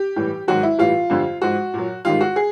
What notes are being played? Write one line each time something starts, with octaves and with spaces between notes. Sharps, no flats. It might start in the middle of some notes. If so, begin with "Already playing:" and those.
Already playing: G4
A2 E3 G3
G#2 D#3 F#3 F#4
E4
A2 E3 G3 F4
F2 D3 G3
G#2 F3 F#4
A#2 F#3
G#2 D#3 G3 F4
F#4
G#4